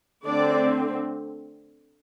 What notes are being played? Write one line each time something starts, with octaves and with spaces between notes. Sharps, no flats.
D3 A3 C4 D4 D5